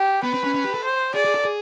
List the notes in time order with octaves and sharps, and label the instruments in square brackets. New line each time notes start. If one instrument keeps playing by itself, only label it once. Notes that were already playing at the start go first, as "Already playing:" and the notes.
Already playing: [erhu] G4
[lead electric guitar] B3 [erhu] B4
[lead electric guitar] C4
C#4
C#4
G4
A4
[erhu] C5
[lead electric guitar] G#4 [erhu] D5
[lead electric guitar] G#4
A4
G#4